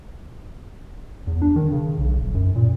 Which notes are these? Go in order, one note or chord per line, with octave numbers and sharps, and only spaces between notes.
E2
D4
D#3
C#3
B1
D#1
F#2
A#2